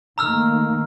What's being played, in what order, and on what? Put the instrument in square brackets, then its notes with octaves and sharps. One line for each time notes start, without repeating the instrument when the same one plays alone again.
[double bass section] D#3 A3 A#3 [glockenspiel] A#5 E6 F6